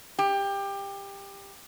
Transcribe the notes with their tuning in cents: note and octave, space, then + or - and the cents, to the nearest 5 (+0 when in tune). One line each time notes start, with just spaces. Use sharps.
G4 +20